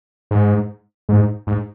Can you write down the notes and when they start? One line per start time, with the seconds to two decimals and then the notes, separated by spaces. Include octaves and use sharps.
0.31 G#2
1.09 G#2
1.47 G#2